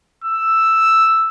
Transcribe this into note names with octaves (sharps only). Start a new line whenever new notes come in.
E6